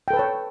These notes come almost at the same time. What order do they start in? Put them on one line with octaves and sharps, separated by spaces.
G5 A4 B4 A5 C#5